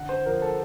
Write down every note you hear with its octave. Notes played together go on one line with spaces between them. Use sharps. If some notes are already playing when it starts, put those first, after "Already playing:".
Already playing: D3 F#5
C5
F3 A#4
A4